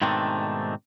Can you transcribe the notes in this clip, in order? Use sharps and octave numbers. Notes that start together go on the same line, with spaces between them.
G#2 B2 D#3 A3 C4 D4